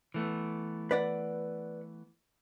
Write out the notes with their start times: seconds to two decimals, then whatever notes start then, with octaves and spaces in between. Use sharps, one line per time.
0.14 E3 A3 B3
0.91 B4 D5 F#5